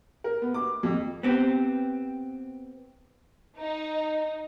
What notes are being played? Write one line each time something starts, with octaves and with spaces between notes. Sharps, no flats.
A#4
B3
D6
F2
B3 C4 G4
D#4